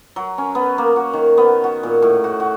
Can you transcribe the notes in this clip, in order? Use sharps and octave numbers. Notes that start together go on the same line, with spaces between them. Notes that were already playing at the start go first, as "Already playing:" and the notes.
F#3
C#4
B3
A#3
F#4
D#3
B3
F#4
A#2
A2
F#4
F#4